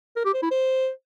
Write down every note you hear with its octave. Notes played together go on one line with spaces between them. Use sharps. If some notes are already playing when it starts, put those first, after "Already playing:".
A#4
G4
C5
E4
C5